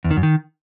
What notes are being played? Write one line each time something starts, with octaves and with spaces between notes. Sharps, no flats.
E2
D#3
F#2
D#3